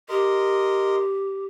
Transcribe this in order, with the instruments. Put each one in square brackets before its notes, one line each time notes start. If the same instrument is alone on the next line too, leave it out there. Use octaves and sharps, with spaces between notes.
[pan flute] G4 [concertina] A#4 D#5 C6